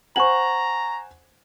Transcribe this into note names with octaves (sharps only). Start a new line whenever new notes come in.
C5 F#5 G#5 A#5 C#6 F#7